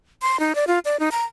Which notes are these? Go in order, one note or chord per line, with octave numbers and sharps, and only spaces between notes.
C6
D#4
D5
F4
D5
D#4
A#5